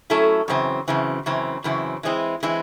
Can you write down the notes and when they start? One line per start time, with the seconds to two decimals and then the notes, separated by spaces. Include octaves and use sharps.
0.10 F#3 A3 C#4 E4 A4
0.48 F#2 C#3 E3 C4
0.88 F#2 C#3 E3 C4
1.26 F#2 C#3 E3 C4
1.64 F#2 C#3 E3 C4
2.03 E3 G#3 C4 E4
2.43 E3 G#3 C4 E4